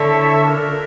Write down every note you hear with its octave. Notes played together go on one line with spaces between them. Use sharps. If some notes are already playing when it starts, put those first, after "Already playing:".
Already playing: D3 E4 A4 C#5 E5
D4 F4 A#4